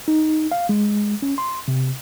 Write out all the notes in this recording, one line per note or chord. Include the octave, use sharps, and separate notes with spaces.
D#4
F5
G#3
C#4
C6
C3